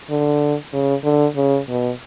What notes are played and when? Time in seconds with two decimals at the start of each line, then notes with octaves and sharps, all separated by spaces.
0.10 D3
0.73 C#3
1.04 D3
1.36 C#3
1.69 B2